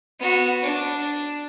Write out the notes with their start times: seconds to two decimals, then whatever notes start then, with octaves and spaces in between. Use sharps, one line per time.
0.20 B3 F#4
0.62 D4